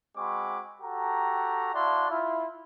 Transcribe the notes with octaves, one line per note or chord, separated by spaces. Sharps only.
G#3 C4 F#4 B5 C#6 D6
F#4 G4 A4 A#5
E4 F#4 D5 F5 A5 C6
E4 F4